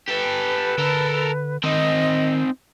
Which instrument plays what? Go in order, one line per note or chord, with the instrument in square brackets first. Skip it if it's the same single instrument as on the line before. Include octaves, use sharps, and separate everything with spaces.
[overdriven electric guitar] G4 A4 [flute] B4
[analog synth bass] D3 [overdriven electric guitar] A4 A#4
[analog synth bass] D#3 [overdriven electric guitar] C4 D#4 [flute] D#5